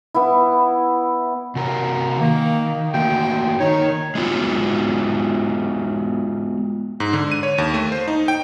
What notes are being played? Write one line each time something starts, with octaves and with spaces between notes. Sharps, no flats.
B3 E4
C3 F#4 A#4
D#3 A#3
A3 A#3 F#4 G5
D#3 D#4 C#5
G#3 B3 F4 F#4
G#2
D3
D#7
C#5
D#2
A3
C5
D#4
G5